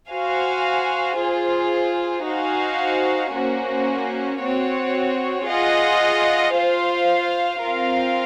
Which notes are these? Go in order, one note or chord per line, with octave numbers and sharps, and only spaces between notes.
F#4 C5 F5 G#5
F4 G#4 C5
D#4 F#4 C5 F5 G#5
A#3 C#4 F#4 C5
C4 F#4 C#5
F4 G#4 D#5 F#5
F4 C5 F5
C4 F4 A#4 F5